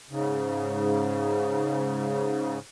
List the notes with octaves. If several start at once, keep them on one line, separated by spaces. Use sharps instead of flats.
G#2 C#3